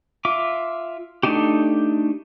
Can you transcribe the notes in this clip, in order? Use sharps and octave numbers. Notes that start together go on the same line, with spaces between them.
F4 E5 D6
A3 D4 D#4 G4